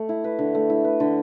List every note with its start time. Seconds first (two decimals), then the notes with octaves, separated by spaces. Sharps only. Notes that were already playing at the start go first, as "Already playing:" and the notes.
Already playing: A3
0.09 E4
0.24 B4
0.39 D3
0.55 A3
0.70 E4
0.84 B4
1.00 D3